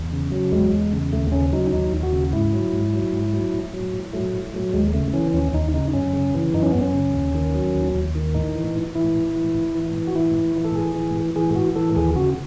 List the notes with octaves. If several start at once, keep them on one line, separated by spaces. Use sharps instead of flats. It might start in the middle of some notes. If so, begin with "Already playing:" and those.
Already playing: E2
C#3
F#3
E2 G#3
E2
C#3
D#2 A3
C#3 C#4
F#3 D#4
D#2 D#4
D#2
F#4
C#3
G#2 E4
F#3
G#2
F#3
G#2
F#3
A2
F#3
A2
F#3 A3
A2
F#3
D#2 G#3
C#3 A3
E3 C#4
D#2 C#4
D#2 D#4
C#3 D#4
F#2 C#4
C#3
E3
F#2 D#4
C#4
F#2 B3
C#4
C#3
D#2
D#3
F#3
D#2
D#2
D#3
A2 D#4
E3
A2
E3 E4
A2
E3
A2
E3
A2
F#4
E3 E4
A2
E3
A4
A2 G#4
E3
A2
E3 G#4
A2 F#4
E3 A4
D#2 G#4
C#3 F#4